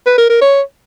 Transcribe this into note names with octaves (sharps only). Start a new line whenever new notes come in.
B4
A#4
A#4
C#5